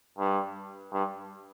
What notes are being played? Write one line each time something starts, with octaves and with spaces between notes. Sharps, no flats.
G2
G2